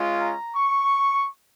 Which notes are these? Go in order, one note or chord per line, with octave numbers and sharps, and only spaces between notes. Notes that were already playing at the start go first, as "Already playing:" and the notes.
Already playing: G#3 C#4 F4
A#5
C#6